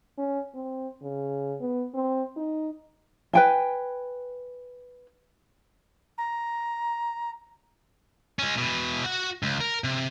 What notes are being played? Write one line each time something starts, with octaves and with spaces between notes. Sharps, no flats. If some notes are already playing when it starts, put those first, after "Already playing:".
C#4
C4
C#3
B3
C4
D#4
B4 G5 G#5
A#5
G#3 C#4
B2 E3
F#4 F#5
C#2
A#4
C3